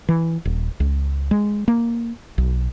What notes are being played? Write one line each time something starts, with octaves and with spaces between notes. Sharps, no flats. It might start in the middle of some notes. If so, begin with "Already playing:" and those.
E3
D#1
C#2
G#3
A#3
B1